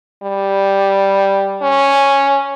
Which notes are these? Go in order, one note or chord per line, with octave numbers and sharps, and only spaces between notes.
G3
C#4